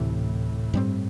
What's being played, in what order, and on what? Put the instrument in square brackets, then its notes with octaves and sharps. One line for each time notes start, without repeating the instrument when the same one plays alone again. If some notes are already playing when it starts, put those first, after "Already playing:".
Already playing: [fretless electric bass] D2 C3 E3 [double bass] A2
[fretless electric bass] G2 G3 C4